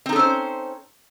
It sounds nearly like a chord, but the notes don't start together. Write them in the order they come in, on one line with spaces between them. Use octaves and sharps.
C4 D#4 A4 C#4 C5